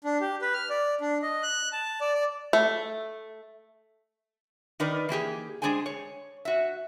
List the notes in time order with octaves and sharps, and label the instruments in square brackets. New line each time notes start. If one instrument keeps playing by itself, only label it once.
[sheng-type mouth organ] D4
G4
B4
F6
D5
D4
D#5
F#6
A5
D5
D5
[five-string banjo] A3
[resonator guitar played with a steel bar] D#3 D#4 A#4 B4 D5
E3 A#3 G4 G#4
G#3 D4 G#4 C5 G5 G#5
C#5
F#4 E5